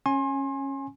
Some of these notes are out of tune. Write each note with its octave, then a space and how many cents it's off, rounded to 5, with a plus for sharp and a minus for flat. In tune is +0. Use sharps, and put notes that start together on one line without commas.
C#4 -20 G#5 +0 C6 +35